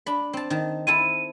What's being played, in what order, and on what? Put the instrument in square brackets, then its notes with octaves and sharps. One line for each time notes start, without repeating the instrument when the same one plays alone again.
[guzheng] D4 B5
C4 A5
D#3 A5
[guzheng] C4 E4 A4 [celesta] D#7